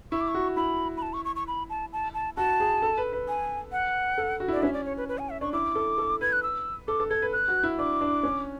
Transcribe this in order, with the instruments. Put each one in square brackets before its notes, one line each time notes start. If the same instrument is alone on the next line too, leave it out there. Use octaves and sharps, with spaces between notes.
[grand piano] E4 [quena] C#6
[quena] D6
C#6
[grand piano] F#4
[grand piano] E4 [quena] B5
[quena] B5
A5
C#6
C#6
C#6
B5
A5
A5
A5
[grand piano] F#4 [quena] A5
[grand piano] G#4
A4
B4
B4
[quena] G#5
F#5
[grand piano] A4
F#4
E4
[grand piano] D4 [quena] D5
[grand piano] C#4 [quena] E5
[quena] D5
C#5
B4
B4
G#5
E5
[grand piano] D4 [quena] C#6
[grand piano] E4 [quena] D6
[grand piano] A4
A4
[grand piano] B4 [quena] G#6
[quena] F#6
E6
[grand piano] A4 [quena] D6
[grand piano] A4
[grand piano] A4 [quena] G#6
[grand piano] B4
[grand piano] B4 [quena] F#6
[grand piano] F#4
E4
[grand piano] D4 [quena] D6
[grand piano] D4
C#4